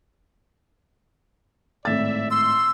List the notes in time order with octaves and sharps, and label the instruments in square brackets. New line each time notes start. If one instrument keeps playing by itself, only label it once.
[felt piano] G#1 A2 A6 [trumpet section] D5 E5
[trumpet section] C6 [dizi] E6